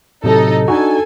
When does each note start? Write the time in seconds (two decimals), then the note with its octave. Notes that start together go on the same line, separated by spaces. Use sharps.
0.24 A2 C3 F#3 D#4 A4 D#5
0.68 D4 D#4 F#4 A4 G#5